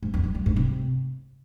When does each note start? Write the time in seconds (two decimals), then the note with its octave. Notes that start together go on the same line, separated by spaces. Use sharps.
0.03 G#2
0.14 F2
0.23 G2
0.35 G2
0.46 G#2
0.56 C3